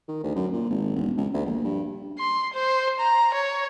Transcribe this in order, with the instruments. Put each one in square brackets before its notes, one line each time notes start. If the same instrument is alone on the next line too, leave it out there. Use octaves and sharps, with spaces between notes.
[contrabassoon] D#3
D2
F#2
A#2
G#1
E1
C#2
D2
A#1
G2
[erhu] C6
C5
A#5
C#5